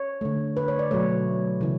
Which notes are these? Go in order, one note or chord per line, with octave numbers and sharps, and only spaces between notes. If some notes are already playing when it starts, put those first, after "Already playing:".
Already playing: C#5
D3 A3
B4
C#5
D5
B2 F#3 A3 C#5
C#3 E3